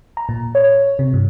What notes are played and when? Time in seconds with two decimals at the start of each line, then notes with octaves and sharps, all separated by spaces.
0.17 A#5
0.29 A#2
0.55 C#5
0.99 C3
1.14 G2